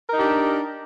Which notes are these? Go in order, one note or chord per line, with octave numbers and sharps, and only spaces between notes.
D4 D#4 G4 A#4